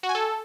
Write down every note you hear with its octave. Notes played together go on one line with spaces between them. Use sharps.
F#4
G#5
A4